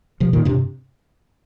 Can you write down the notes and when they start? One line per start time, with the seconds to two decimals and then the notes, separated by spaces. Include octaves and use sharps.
0.20 C3 F3
0.33 A#2 D#3
0.45 G2 C3